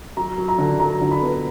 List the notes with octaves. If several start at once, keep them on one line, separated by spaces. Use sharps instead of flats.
F#3 A#5
F#3
A#5
D3
F#3 A#5
D3
B5
B3